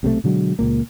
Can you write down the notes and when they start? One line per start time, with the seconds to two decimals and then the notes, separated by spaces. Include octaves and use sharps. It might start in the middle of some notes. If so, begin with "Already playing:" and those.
0.03 B1 C3 F#3 A3
0.24 B2 D3 F#3 G#3
0.59 C#2 A#2 A#3